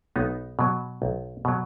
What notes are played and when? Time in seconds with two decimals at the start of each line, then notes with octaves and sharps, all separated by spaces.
0.16 B1 B3 D#4
0.59 B2 F#3
1.02 B1
1.45 B2 F#3